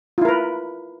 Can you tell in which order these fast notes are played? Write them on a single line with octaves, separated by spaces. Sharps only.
F4 E4 A#4 B4